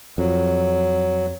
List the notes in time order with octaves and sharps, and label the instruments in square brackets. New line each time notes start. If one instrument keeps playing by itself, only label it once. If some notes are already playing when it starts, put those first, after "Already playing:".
[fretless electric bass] F2 [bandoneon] F#3